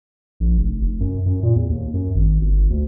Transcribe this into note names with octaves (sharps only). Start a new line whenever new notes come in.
A#1
F1
F1
F#2
F#2
A#2
E2
D#2
F#2
G#1
G1
D2